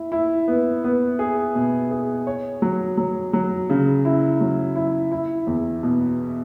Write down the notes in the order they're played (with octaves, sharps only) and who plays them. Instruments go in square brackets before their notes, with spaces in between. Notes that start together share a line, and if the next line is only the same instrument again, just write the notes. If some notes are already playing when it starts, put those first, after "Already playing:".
Already playing: [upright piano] E4
E4
B3
B3
G#4
B2
G#4
C#5
F#3
F#3
F#3
C#3
E4
F#3
E4
E4
E2
B2